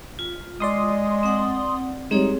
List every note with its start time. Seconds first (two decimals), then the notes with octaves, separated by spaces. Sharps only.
0.19 F4
0.60 G#3 D5 C6 D#6
1.23 C4 F#5
2.11 G3 G#3 C4 D#4 G#4 C#5